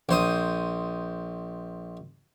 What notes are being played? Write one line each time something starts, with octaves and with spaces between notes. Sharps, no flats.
A#1 C5 D#6